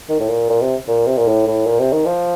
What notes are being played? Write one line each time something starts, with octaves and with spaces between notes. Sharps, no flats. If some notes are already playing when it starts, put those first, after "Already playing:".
D#3
A2
A#2
A#2
C3
A#2
C3
A#2
A2
A2
A#2
C3
D#3
F3